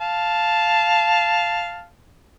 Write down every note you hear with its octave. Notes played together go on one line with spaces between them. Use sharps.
F5 A5